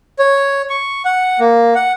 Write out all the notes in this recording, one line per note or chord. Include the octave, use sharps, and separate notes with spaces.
C#5
C#6
F#5
A#3
F#5